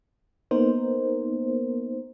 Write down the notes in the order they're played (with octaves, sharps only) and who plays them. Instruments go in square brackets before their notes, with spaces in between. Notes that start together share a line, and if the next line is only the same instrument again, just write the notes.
[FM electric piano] A#3 B3 D#4 A#4 C5